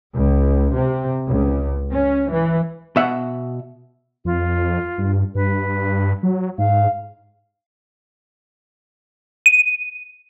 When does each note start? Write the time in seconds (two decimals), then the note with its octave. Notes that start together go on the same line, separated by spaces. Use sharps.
0.15 C#2
0.77 C3
1.28 C#2
1.92 C#4
2.32 E3
2.96 B2 E5 F#5
4.25 F2 F4
4.98 G2
5.35 G2 B4
6.23 F#3
6.58 G#2 F5
9.46 D#7